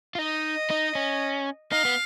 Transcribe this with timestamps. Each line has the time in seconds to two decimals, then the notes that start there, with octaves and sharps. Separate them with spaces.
0.15 F4
0.19 D#4 D#5
0.70 D#4
0.95 C#4
1.72 D#4 F5
1.85 B3